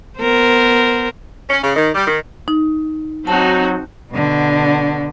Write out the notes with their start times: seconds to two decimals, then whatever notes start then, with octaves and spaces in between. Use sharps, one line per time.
0.18 B3 A#4 C5
1.50 C#4
1.62 C#3
1.76 D#3
1.95 G3
2.07 D#3
2.48 D#4
3.27 F#3 C4 D#4 F#4 A5
4.12 B2 D3